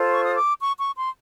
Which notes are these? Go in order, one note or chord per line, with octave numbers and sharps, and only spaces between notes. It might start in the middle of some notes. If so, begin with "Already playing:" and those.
Already playing: F4 A4 C5
C#6
D#6
D6
C#6
C#6
C6